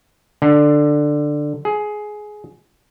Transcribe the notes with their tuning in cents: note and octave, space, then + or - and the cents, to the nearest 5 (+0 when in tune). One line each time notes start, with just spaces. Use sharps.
D3 +10
G#4 +15